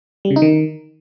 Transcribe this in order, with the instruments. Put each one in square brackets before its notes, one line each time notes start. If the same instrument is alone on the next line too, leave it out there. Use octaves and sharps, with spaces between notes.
[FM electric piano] G3
C#3
D#4
D#3